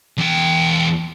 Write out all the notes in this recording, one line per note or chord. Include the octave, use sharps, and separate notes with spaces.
E2 G5